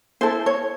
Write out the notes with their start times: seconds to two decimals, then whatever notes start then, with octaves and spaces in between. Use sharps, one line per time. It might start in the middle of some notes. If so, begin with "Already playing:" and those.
0.21 E4 A4 C5
0.46 C#5